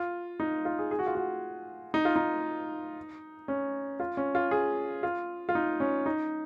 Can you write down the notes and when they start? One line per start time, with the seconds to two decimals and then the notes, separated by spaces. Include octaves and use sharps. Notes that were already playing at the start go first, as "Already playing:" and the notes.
Already playing: F4
0.40 D#4
0.65 F4
0.79 G#4
0.91 G#4
0.99 F#4
1.07 F4
1.15 F#4
1.94 D#4
2.05 F4
2.16 D#4
3.48 C#4
4.00 F4
4.17 C#4
4.35 F4
4.51 G#4
5.03 F4
5.49 F4
5.55 D#4
5.80 C#4
6.06 D#4